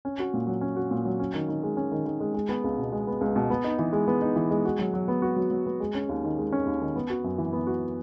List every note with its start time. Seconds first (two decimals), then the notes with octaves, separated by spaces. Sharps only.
0.05 C#4
0.19 F#4
0.34 A#2
0.47 F#3
0.61 C#4
0.76 F#4
0.91 A#2
1.05 F#3
1.20 C#4
1.34 D#3
1.48 D#3
1.63 G#3
1.77 C#4
1.92 D#3
2.05 D#3
2.20 G#3
2.34 G#3
2.49 B3
2.64 C#2
2.78 B2
2.92 G#3
3.07 B3
3.21 C#2
3.36 B2
3.50 B3
3.64 D#4
3.79 E3
3.93 G#3
4.07 B3
4.22 D#4
4.36 E3
4.51 G#3
4.65 F#4
4.79 F#3
4.94 F#3
5.08 B3
5.22 F#4
5.36 F#3
5.51 F#3
5.66 B3
5.80 G#3
5.95 C#4
6.09 D#2
6.24 D#3
6.38 G#3
6.52 C#4
6.66 D#2
6.81 D#3
6.95 B3
7.10 F#4
7.24 F#2
7.38 E3
7.53 B3
7.67 F#4